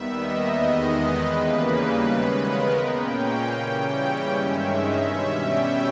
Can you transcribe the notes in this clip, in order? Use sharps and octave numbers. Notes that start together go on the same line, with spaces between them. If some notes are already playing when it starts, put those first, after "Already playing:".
Already playing: D#2 D#3 G3 B3 E5
D#5
E2 D#3 G#3 B3
B4
D#2 C#3 E3 G3 A#3 B4
B4
C#3 G#3 B3
A#4
A#2 A#3 C#4 G5
C#3 E3 G3 C#4 G5
G5
G2 D#3 G#3 C#4 E5
E5
B2 G3 C#4
G5